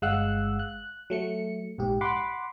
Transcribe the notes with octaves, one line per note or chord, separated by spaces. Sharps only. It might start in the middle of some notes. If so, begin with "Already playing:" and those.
G1 G#3 F5 F#5 E6 F#6
F#6
F#3 A3 C#7
A#1 G#2 G4
F#5 B5 C6 D6